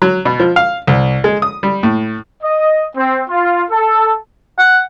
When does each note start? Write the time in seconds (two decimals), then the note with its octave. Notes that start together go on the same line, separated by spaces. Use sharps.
0.02 F#3
0.25 B2
0.40 F3
0.56 F5
0.87 C2
1.24 G#3
1.42 D#6
1.63 G3
1.83 A2
2.43 D#5
2.97 C4
3.30 F4
3.71 A4
4.58 F#5